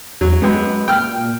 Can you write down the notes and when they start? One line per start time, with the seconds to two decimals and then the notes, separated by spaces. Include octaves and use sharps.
0.21 E2 F#3
0.42 F#2 G#3 B3
0.88 A#2 G5 F6